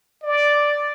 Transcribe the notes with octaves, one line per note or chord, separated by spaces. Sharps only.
D5